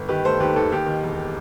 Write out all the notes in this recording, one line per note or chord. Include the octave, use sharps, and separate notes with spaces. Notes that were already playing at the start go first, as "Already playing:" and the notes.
Already playing: G1
D#3 G4 B4
A3 A4 C5
D#2 G4 B4
D#2 A4
D#2 G4
D#3
E1